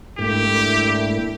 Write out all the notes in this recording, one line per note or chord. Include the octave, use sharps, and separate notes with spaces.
G#2 A3 A#3 D4 E4 G4